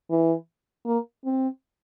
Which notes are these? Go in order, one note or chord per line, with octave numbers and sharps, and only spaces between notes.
E3
A#3
C4